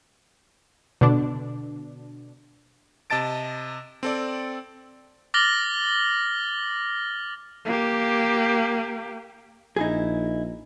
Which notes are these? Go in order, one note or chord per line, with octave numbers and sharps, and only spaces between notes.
B2 D3 D4
C3 D#5 A5 A6 D7
C4 A4 D5
D6 F6 A6 A#6 F#7 G7
A#3 G4
A#1 D#4 E4 G#4